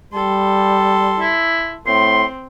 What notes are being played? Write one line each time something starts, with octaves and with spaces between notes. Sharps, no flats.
G3 A4 C6
E4
A2 C4 C6